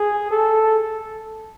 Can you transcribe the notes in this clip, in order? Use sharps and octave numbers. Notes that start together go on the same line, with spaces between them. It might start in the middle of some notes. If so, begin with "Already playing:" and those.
Already playing: G#4
A4